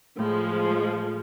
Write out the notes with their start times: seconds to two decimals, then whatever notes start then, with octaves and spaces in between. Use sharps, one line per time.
0.19 A2 F3 G#3